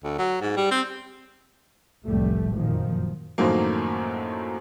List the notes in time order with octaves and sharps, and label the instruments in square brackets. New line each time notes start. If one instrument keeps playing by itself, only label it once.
[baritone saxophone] D2
F#3
G#2
G3
C4
[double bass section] F1 C2 A2 G3 A3
F#2 A#2 D#3 F3
[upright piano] F#2 A2 D#3 F3 F#3 A#3